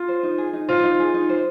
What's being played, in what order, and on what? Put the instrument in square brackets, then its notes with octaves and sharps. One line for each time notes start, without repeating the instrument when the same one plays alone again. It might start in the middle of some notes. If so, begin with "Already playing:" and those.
Already playing: [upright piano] F4
[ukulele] C5
D#4
G#4
D#4
[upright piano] F4 [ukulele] C5
[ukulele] D#4
G#4
D#4
C5